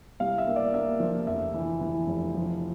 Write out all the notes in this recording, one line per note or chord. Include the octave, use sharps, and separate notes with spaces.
C2 F5
E5
A#3
D5
A#3 E5
F3
F1 E5
E3
E3
F1
F3